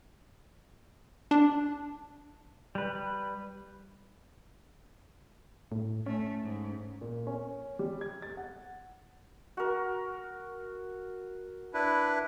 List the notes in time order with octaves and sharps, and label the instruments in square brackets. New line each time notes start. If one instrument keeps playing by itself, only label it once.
[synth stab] D4
[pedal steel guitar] G3 B4
[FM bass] A2
[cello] A3 [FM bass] C#4
[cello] G#2
[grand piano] A#2
C#4
G3
G#6
A6
F#5
[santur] F#4 A#4
[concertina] D4 E4 B4